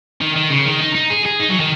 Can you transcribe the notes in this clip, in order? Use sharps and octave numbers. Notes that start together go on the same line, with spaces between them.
D#3
D#3
C#3
D#3
D#4
D#4
G#4
G#4
D#4
F#3
D#3